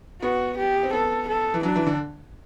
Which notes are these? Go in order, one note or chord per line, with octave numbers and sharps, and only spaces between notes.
B3 F#4
G4
C4
B3 A4
A4
E3
F#3 D4
E3
D3